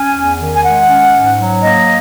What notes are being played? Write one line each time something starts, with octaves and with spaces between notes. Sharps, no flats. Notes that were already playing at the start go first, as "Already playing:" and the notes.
Already playing: C#4 G#5
E2
D#3
G#5
G#3 F#5
C#4
G#2
F#3
A#3 D#5